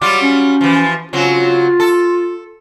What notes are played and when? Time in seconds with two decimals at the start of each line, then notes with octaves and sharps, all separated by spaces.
0.01 F#3 G3 F4 D6
0.22 C#4
0.61 E3 F3
1.13 C#3 F#3 C4 F4
1.80 A4